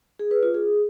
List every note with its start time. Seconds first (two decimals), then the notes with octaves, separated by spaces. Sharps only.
0.19 G#4
0.31 B4
0.43 F4
0.54 G#4